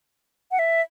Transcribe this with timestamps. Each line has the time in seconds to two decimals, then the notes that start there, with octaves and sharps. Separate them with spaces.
0.51 F#5
0.59 E5